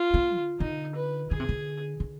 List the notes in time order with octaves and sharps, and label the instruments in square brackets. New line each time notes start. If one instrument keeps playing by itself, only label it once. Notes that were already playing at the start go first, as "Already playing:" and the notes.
Already playing: [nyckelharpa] F4
[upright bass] B3
D3
[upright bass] D3 [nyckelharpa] D#4
[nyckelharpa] B4
[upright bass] D3 [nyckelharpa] G#4
[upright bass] C3
D3
D3